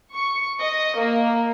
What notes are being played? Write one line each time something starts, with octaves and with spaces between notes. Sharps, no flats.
C#6
D#5
A#3